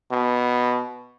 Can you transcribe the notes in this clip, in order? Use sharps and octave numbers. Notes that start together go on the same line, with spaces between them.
B2